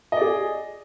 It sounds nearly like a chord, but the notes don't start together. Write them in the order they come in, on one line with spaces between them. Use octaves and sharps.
D#5 D5 G#4